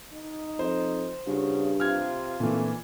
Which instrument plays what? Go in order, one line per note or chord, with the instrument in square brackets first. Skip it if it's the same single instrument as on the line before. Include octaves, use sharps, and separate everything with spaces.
[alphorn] D#4
[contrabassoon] F2 [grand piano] C5
[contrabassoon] G2 [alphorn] C#3 [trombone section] F4 F#4
[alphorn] C3 [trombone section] F4 [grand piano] F6 G#6
[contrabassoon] D1 [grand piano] A#2 E3 [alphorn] A3